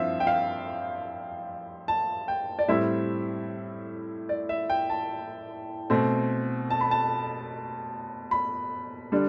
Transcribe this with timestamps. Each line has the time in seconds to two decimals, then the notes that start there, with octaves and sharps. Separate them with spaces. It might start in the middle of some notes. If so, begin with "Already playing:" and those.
Already playing: G2 F3 C4 E4 E5 F5
0.20 G5
0.27 F5
1.88 A5
2.28 G5
2.59 D5
2.68 A2 G3 C4 E4 E5
4.29 D5
4.49 E5
4.70 G5
4.90 A5
5.90 B2 A3 C4
6.70 A5
6.81 B5
6.91 A5
8.31 B5
9.12 D3 G3 D4